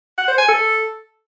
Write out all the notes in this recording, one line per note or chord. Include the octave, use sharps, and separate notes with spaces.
F#5
C5
G#5
A4